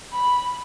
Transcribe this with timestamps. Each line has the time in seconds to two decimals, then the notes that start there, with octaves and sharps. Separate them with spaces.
0.13 B5